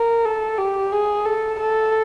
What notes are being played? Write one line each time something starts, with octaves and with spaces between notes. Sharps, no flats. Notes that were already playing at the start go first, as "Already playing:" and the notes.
Already playing: A#4
A4
G4
G#4
A4
A4